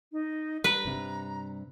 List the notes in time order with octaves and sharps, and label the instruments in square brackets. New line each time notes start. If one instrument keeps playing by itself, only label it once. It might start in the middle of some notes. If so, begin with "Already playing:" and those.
[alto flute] D#4
[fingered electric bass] G3 [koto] B4 [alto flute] A#5
[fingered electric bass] G2 C3 G3